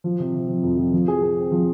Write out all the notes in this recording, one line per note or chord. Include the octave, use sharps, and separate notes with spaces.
F3
C3
C3
F3
F2
F3
F3
G#4
G#4
C4
F3